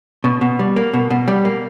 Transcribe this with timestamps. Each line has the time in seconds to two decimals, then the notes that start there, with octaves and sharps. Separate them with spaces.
0.24 B2
0.41 B2
0.59 G3
0.76 A#3
0.93 B2
1.10 B2
1.28 G3
1.45 A#3